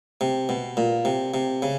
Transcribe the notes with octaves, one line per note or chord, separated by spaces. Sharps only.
C3
B2
A#2
C3
C3
C#3